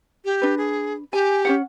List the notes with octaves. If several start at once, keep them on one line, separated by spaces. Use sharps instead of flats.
G4
D4 B4
G#4
G4 G#5
C#4 F#4 F#5